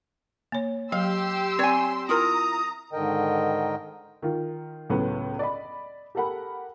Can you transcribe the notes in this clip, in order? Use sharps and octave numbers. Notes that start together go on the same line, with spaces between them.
A#3 C#5
F#3 G4 F5 C6 E6
C4 C#5 D5 G#5
E4 F4 A#4 A#5 D#6
G#2 D3 D#3 A#4 D#5 G5
D#3 F4
C#2 A2 F#3 B3
D5 D#5 B5
G4 A4 A#4 F#5 B5